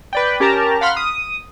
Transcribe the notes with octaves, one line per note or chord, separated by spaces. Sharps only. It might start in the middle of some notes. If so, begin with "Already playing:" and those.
B4 D5 G5
C#4 G4 A#4 A5 A#5
F5 F#5 B5 C6 F6
D#6